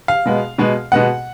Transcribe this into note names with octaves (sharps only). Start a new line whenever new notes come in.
F5
B2 G#3 B3
B2 G#3 B3
B2 G#3 B3 F#5